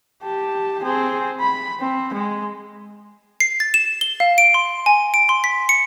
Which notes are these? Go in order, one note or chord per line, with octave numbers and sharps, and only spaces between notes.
G4 A5
C4 G#4
B5
C4
G#3
C7
A6
E7
G7
F5
D7
C6
G#5
D7
C6
B6
C#7